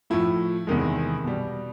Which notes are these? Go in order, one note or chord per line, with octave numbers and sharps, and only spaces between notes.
A2 F3 A3 E4
E2 C3 D#3 G#3
B2 G3